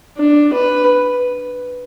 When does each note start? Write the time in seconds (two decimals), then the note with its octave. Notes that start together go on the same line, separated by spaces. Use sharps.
0.17 D4
0.53 B4